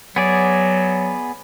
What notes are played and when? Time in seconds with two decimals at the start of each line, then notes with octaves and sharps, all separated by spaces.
0.16 F#3 B3 G#4 D5